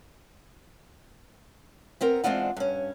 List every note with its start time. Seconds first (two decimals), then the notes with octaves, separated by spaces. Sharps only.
2.01 B3 C4 A#4
2.24 E2 G#3 C4 D4 F4 F#5
2.57 G2 C#4